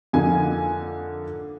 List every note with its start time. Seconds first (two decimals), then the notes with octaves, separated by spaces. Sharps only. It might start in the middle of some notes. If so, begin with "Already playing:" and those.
0.13 F2 D3 F3 A#3 D#4 G#5